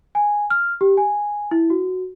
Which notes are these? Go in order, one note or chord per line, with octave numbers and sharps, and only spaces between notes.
G#5
F6
G4
G#5
E4
F#4